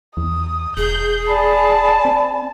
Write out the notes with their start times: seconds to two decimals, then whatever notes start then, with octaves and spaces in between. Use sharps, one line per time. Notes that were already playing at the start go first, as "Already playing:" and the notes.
0.17 E2 D#6
0.77 E1 G#4 G6
1.27 D5 G#5 A5 B5
2.05 C4